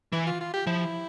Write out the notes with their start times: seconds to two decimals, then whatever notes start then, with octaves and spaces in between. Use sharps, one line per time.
0.12 E3 E4
0.27 F4
0.40 F4
0.54 G4
0.67 F3 E4